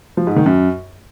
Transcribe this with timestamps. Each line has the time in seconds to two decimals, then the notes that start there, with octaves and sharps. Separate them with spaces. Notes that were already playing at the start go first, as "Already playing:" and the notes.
0.17 F3
0.27 G#2
0.36 D#3
0.46 F#2